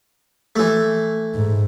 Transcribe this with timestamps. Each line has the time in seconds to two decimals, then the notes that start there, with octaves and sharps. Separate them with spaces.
0.56 E3 A3
1.35 G#2